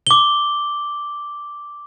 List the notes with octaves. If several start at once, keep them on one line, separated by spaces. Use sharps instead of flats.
D6 G7